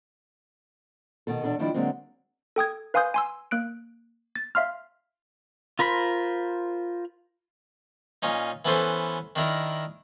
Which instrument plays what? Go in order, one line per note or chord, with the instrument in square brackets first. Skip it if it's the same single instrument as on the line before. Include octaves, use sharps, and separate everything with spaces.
[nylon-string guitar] B2 D#3 A4
E2 B2 D4 A4
D#3 F3 G3 D4 E4 G4
D3 F#3 G#3 A#3 C4
[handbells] A4 G5 D#6 G#6
B4 F5 G#5 C6 D#6 G6
G#5 C6 E6
A#3 F#6 D7
A6
E5 F5 C6 F6
[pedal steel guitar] F4 A#4 C5 B5
[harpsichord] A#2 C#4 D#4
E3 B3 C#4 A4 C5
D#3 D4 E4 A#4